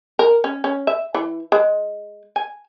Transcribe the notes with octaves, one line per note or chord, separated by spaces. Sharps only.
A#4
C#4
C#4
E5
E3
G#3
G#5